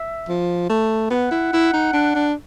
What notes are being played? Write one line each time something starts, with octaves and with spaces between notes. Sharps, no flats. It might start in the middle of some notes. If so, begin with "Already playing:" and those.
Already playing: E5
F3
A3
B3 F#5
E4
E4
D#4
D4
D4